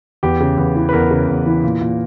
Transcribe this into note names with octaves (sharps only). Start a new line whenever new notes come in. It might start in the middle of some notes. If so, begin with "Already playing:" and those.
E2 G4
C#3
E2
E3
B4
E2 A#4
C#3
E2
E3
A#2
A#2